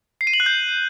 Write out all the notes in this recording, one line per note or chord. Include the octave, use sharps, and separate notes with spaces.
C7
D#7
F#7
F#6
G6